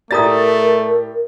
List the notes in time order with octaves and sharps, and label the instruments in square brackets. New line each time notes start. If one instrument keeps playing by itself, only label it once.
[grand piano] A2 G4 A6 [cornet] A3 [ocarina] A#4 [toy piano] D5 A#5 D#6